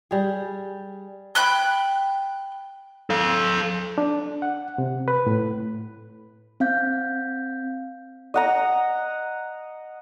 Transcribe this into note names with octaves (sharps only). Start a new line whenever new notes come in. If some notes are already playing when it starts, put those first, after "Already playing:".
G3 G#4
G5 B5 F#6 G6
A4 F5
D4
F#5
C3
B4
A2
C4 F5 G6
D#5 F#5 A#5